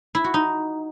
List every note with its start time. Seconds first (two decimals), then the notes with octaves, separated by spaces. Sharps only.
0.15 E4
0.24 F#4
0.34 D#4